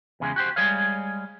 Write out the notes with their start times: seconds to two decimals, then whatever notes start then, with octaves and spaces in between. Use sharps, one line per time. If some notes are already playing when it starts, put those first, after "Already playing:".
0.20 E2 C#3 G#3
0.36 F#4 G4 C5
0.56 G3 G#3 G#4 C#5 F5